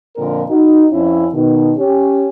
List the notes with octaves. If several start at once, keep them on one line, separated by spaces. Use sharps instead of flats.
F2 A#2 D3 A#4
D#4 F#4
F2 C#4 E4
B2 D#3
C#4 G4